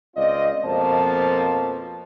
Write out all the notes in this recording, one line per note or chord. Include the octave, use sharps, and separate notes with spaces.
C#2 C4 F4 D5 D#5
F2 B2 F3 A#3 C5 A5